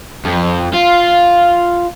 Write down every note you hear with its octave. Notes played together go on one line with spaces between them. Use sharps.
F2
F4